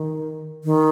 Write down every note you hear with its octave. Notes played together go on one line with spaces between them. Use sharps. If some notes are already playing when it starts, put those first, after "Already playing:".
Already playing: D#3
D#3